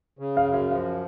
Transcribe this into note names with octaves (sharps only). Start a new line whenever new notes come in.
C#3
F5
F#2
F5
F3 F5